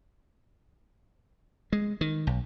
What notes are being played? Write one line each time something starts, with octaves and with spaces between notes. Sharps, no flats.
G#3
D#3
B1